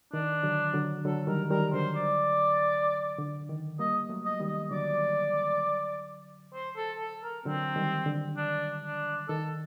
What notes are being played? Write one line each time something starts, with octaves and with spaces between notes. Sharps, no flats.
D#3 D4
D3 F#3
D3 F#3
D3 F#3 A4
D#3 G3 A#4
D#3 G3 A#4
D3 F#3 C5
D5
D3
D#3
G3 A#3 D#5
F#3 A3
D#5
D#3 G3
D#5
D3 F#3 D5
C5
A4
A4
A#4
D3 F#3 C4
D#3 G3
D3
D4
D4
D#3 A4